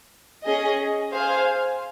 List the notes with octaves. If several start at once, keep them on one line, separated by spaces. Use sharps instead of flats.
C#4 G#4 D#5
G#4 C5 F5 G#5